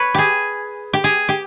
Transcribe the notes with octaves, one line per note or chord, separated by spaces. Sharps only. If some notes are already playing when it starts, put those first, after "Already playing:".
Already playing: B4 C#5
G4 G#4
G4
G#4
G4